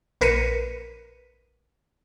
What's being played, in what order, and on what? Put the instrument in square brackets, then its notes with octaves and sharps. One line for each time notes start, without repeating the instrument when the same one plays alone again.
[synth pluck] A#1 A#4 B4 B6 C#7 D#7